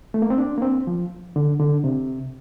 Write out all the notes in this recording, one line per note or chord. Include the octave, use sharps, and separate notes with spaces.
A3
A#3
C4
D4
A#3
C4
F3
D3
D3
C3